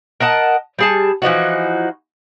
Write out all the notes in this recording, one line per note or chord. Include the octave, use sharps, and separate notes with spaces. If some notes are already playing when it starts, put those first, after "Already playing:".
A#4 D#5 F#5 A5
G3 G#4 A5
E3 F3 D#4 F#4